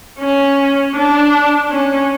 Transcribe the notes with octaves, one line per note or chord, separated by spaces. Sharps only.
C#4
D4
C#4